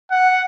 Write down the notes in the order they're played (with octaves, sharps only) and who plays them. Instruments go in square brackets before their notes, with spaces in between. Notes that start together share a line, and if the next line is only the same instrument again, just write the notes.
[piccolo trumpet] F#5